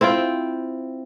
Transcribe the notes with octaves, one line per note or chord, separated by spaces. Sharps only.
C4 E4 F4 G5